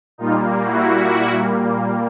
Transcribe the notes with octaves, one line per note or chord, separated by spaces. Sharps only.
A#2 G3 A#3 D#4 F4
E4 F#4